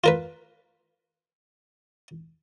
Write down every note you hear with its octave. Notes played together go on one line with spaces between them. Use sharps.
F4 A#4 B4